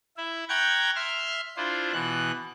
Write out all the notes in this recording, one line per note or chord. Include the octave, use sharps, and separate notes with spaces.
E4 E5
F#5 G5 A#5 C#6 G6 G#6
E5 C6 F6
D4 E4 F4 C5
B2 E3 F#6